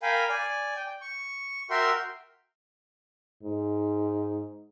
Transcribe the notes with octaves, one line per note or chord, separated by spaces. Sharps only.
A#4 F5 G5 G#5 B5
D5 G#5
G5
C#6
F#4 A#4 E5 G5 C6
G#2